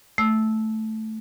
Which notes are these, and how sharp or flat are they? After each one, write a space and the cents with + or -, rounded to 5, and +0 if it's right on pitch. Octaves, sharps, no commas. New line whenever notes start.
A3 +0 E6 -10